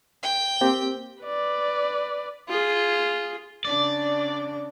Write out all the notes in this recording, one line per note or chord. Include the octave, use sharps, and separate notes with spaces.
G5
A#3 C4 G4
B4 D5
F4 G#4
C#3 D4 D5